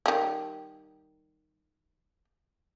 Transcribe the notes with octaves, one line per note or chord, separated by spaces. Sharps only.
D#3 G3